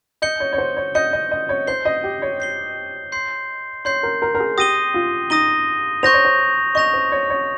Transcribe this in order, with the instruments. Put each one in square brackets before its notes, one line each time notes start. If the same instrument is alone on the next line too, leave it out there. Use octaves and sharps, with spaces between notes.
[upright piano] D#5 [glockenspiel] G6 C#7 G7
[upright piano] C#5
C#5
C5
C#5
[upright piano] D#5 [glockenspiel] G6 C#7 G7
[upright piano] D#5
D#5
C#5
[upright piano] C5 [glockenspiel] G6 C7 G7
[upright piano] D#5
G4
C#5
[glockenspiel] G6 C7 G7
C6 G6 C7
[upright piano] C#5 [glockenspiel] C6 G6 C7
[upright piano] A#4
A#4
A#4
G#4
[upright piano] G4 [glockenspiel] D#6 A#6 D#7 G7
[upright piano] F4
[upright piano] D#4 [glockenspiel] D#6 A#6 D#7 G7
[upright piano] C5 [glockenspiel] C#6 G6 A#6 F7
[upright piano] C#5
C5
[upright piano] D#5 [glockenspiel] C#6 G6 A#6 F7
[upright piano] C5
C#5
C#5